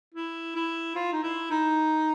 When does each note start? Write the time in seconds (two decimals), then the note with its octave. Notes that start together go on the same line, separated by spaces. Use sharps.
0.14 E4
0.56 E4
0.96 F4
1.13 D#4
1.23 E4
1.51 D#4